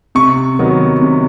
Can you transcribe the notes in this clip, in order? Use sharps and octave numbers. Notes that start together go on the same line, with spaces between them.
C3 C#6
D#3 F#3 B3
C3